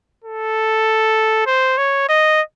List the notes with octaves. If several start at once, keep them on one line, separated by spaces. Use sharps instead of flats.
A4
C5
C#5
D#5